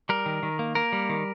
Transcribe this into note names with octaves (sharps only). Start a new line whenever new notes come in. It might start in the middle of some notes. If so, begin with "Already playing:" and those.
G3 A#4
D#3
D#3
A#3
A#3 A#4
G3
D#3